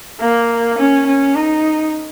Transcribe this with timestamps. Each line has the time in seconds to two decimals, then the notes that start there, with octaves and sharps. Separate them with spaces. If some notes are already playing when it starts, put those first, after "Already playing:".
0.21 A#3
0.79 C#4
1.07 C#4
1.35 D#4